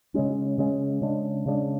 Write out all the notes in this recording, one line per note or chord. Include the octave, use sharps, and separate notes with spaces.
C#3 G#3 C#4
C#3 G#3 C#4
C#3 G#3 D4
C#3 G#3 D4